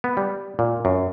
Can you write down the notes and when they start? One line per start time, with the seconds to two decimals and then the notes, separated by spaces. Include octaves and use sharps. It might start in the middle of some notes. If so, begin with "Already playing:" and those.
0.04 B3
0.17 G3
0.59 A#2
0.85 F#2